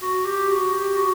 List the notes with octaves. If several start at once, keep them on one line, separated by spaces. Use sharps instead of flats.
F#4
G4
F#4
G4
F#4